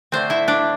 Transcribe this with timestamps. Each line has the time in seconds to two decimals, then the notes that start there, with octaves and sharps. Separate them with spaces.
0.12 D3 A3 C4 D4 C5
0.30 E4 E5
0.48 D4 D5